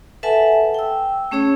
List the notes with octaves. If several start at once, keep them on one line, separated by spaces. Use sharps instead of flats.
A4 B4 E5 F#5 G#5 A5
G5 E6
A3 C#4 G#4 C#5 E6